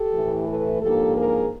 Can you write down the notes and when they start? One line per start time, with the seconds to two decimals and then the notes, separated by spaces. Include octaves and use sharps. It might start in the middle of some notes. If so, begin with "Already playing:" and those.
Already playing: G4 A4
0.13 A2 E3 A3
0.47 A4 B4
0.82 G#2 F3 A#3 D4 G4 A4
1.16 G#4 A#4